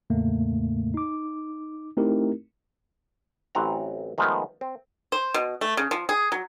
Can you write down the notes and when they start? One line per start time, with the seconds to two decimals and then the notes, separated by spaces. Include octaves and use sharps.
0.10 E2 A2 C#3 A3 A#3
0.94 D#4 D6
1.97 A3 C4 D#4 E4 G4 A#4
3.55 A1 E3 F#3 C4 F#5 A#5
4.18 D#3 F3 G#3 A3 B3
4.61 C4
5.12 C5
5.34 B2
5.61 A3
5.77 C#3
5.91 F3
6.09 G#4
6.32 F#3